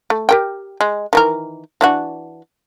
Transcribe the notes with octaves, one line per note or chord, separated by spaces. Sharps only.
A3
G4 A#4 G5
G#3
D#3 E3 A#4
E3 D4 F#4